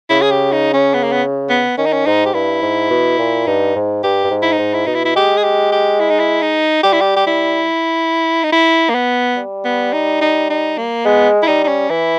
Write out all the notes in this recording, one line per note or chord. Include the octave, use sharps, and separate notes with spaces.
C#3 E4
G#4
G4
D#4
C#4
B3
A#3
B3
B3
D#3 C#4
D#4
C#4
G#2 D#4
G4
G2 E4
G#2
B2
A#2
G2 D#4
G#2
G2 G4
G2
G#2
E4
D#4
G#2
E4
B2 D#4
E4
E4
G#3 G4
G#4
G4
G4
E4
D#4
E4
D#4
G3 G4
E4
G4
G4
G3 E4
D#4
E4
A#3
B3
G3
B3
D#4
D#4
D#4
A#3
G#3 B3
E4
G3 D#4
D#4
C#4
E3 E4